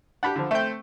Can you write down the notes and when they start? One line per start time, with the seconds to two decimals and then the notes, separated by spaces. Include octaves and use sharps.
0.23 D4 G4 F#5 A5 B5
0.36 D3 F3
0.51 A3 C4 E5 G5 G6